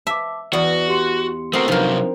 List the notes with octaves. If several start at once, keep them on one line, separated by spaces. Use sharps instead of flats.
E5 A5 D6
E2 F#4 D5
G4 C6 C#7
A3 C4 F#4 A#4 D#6 C7 C#7
C3 F3 F#3 D4 D#4 A#4 F7